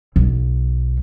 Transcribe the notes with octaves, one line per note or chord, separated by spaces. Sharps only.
B1